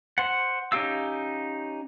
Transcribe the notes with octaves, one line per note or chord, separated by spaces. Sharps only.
C5 F#5
C#4 D#4 G4 F5 E6